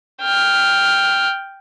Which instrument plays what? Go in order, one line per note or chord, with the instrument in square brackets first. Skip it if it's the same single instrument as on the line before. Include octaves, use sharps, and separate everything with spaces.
[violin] G5 F6